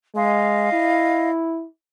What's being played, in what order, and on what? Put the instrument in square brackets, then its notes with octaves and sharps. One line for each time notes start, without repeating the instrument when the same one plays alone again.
[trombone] G#3 [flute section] D#5 F5
[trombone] E4